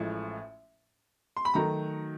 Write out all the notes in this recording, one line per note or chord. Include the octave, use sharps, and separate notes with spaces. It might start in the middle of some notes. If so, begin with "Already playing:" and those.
Already playing: A1 A2 F3 G#3
C6
B5
D#3 F#3 A3 A#5